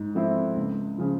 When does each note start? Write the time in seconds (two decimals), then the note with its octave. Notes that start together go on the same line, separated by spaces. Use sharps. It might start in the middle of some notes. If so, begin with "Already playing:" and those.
Already playing: G#2
0.15 F3 A3 C4 E4
0.57 C#2
0.98 C#3 F3